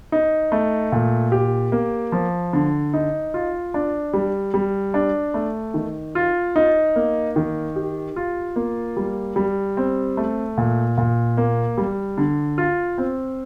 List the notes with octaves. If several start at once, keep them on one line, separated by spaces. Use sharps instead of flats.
D#4
A3
A#2
G4
A#3
F3
D3
D#4
F4
D4
G3
G3
D4
A3
D#3
F4
D#4
A#3
D#3
G4
F4
A#3
G3
G3
C4
A3
A#2
A#2
A#3
G3
D3
F4
C4